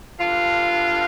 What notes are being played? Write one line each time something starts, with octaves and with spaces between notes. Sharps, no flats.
G2 D3 F4